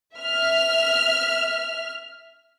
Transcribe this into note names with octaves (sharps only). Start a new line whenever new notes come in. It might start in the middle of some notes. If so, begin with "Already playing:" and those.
E5 F6